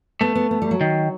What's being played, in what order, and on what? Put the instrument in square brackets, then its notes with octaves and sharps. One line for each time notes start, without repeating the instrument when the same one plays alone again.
[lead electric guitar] A3 [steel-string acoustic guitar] B3
[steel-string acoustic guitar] B3
B3
G3
F#3
[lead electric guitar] D#3